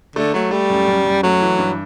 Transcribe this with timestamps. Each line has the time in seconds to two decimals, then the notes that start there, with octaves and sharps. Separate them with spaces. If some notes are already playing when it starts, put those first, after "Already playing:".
0.16 D3 A3
0.34 F#3 A3
0.51 G3 A3
0.70 F#2
0.88 F#2
1.05 F#2
1.23 F#3 A3
1.41 E3
1.58 G2